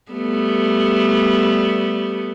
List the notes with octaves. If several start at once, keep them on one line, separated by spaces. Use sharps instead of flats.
G3 A3 B3